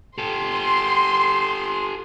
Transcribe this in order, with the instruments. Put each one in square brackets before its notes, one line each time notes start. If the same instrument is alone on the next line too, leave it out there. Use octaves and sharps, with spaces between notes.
[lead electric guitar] G4 A4 [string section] C6